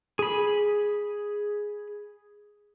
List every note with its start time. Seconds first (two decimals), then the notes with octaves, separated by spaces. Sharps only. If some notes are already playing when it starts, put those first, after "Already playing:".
0.19 G#4 B5